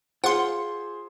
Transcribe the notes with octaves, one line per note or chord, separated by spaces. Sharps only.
F4 G#4 C5 F#5 C6